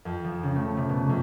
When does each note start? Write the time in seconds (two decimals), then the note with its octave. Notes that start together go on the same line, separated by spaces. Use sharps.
0.05 F2
0.24 F3
0.43 C#3
0.55 A3
0.77 C3
0.89 B2
1.09 F2